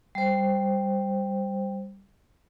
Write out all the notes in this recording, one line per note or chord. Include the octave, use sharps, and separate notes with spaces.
G3 C5